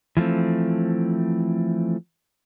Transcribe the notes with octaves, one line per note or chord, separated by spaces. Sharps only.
E3 F3 A3 C4